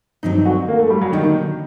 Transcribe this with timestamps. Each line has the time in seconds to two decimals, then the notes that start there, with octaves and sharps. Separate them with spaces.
0.23 G2 D#3 F#3 C4 D#4
0.46 F#4
0.68 A#3
0.79 A3
0.90 G3
1.02 F#3
1.12 D3 D#3 F#3 A#3 D#4